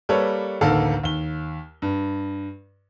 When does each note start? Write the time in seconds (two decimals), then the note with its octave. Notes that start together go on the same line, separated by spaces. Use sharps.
0.09 G3 A#3 A4 B4 C#5
0.61 A1 D2 D#3 A#3 A4 F5
1.03 D#2 G7
1.82 G2